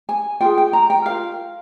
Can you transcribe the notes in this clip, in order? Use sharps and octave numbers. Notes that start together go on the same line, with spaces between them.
G#5
F4 G#4 G5
G5
A#5
G5
F4 A#4 F5